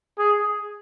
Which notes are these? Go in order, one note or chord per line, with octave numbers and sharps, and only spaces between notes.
G#4